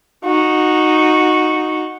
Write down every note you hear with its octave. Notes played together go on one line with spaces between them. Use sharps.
D#4 F#4